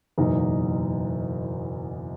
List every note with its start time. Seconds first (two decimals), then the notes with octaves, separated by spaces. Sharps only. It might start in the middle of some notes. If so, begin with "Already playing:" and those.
0.18 F#1 E2 B2 D#4